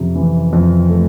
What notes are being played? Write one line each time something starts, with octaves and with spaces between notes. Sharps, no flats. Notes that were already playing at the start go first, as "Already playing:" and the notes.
Already playing: F2 C3
E3
F2
A3